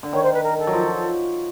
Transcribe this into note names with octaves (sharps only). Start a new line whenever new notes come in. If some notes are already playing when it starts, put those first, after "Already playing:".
D3
D#3 C#5
C5
B4
A#4
A4
F#3
F3